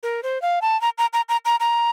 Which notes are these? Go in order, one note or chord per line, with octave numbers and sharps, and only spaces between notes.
A#4
C5
F5
A5
A#5
A#5
A#5
A#5
A#5
A#5